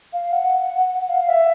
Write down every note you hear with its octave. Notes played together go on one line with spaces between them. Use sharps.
F5
F#5
F5
E5